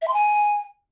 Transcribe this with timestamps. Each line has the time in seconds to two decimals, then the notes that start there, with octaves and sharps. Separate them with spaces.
0.01 E5
0.07 C6
0.13 G#5